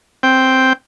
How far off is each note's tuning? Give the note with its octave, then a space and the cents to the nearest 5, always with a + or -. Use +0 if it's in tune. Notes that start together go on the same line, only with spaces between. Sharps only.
C4 +0 G5 +0